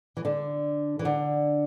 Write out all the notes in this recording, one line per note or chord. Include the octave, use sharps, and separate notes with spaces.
E3
D3
E3
D3